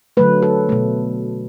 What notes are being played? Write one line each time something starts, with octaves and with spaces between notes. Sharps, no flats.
D3 F#3 A3 B4
A4
B2 A3